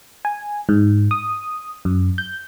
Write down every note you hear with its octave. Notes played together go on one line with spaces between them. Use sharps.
G#5
G#2
D#6
F#2
G6